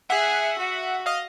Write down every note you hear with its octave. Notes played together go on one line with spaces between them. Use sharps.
G#4 E5 F#5
F#4
D#5 F5